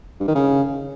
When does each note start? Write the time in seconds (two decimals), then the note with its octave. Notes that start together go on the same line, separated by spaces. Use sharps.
0.20 G2
0.28 D#3
0.35 C#3